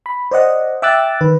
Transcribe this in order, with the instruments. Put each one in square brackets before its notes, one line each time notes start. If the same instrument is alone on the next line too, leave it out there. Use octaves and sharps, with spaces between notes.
[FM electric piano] B5
C5 D5 D#5 F#5
E5 G5 D6 E6 F#6 A6
D#3 B4